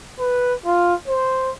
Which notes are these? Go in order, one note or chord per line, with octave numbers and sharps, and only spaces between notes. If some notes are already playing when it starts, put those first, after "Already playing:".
B4
F4
C5